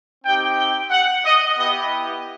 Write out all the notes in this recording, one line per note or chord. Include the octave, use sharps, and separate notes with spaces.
C4 D#4 G4 G5
G5
F#5
D#5
B3 E4 G4 D#5